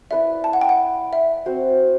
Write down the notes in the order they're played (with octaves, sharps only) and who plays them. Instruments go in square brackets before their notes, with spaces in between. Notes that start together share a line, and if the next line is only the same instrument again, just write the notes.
[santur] E4 B4 D5 [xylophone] E5
[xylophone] A5
F#5
G5
F#5
E5
[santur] C4 F#4 C5